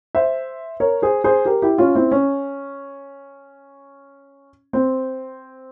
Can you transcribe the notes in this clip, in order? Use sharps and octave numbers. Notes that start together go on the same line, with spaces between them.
C5 E5
A#4 C#5
G#4 C5
G#4 C5
G4 A#4
E4 G4
C#4 F4
C4 E4
C#4
C4